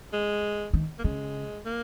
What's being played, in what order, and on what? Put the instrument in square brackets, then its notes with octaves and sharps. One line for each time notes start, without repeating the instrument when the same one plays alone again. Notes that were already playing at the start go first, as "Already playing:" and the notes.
[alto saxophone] G#3
[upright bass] D#3
[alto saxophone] A#3
[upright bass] C#3 [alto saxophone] G#3
[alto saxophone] A#3